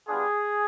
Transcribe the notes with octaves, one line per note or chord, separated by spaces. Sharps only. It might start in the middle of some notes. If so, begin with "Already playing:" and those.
G3 B3 D4 F4 G#4